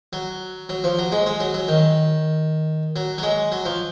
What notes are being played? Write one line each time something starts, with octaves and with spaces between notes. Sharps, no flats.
F#3
F#3
F3
F#3
G#3
G#3
F#3
F#3
D#3
F#3
F#3
G#3
F#3
F3